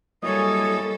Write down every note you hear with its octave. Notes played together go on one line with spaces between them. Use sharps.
F#3 G3 A#3 E4 A4 C#5 D#5 G#5